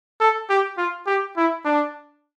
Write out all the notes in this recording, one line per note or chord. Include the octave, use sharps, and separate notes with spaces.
A4
G4
F4
G4
E4
D4